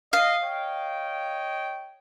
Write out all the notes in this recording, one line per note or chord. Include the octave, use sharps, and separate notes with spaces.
D#5 F5
C#5 D#5 G5